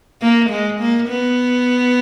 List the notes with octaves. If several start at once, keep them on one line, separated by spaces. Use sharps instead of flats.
A#3
G#3
A#3
B3